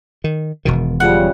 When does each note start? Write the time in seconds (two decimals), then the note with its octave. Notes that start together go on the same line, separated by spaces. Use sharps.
0.24 D#3
0.65 E1 B2 D#3
1.00 C#3 F3 G3 F#5